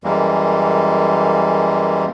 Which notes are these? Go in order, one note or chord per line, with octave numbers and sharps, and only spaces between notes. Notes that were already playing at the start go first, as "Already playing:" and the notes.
F#2 E3 G3 G#3 A#3